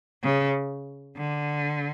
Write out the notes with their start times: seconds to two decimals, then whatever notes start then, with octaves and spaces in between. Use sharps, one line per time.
0.23 C#3
1.16 D3